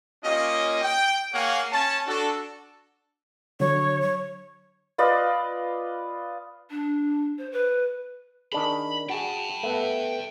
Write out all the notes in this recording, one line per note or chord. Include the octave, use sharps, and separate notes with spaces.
A#3 C#4 F4 G4 D#5
G5
A#3 G#4 C#5 F5 F#5 G#5
C#4 A5
D4 F#4 A4
D3 F#3 C#5
C#5
F4 B4 D5 D#5
D4
C5
B4
D#3 D4 G#4 B5
F#4 G#4 G5 A5
A3 B3